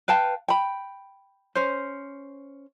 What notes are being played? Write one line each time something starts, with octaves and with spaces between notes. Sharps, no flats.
B4 F5 G5 A5
G5 B5
C#4 C5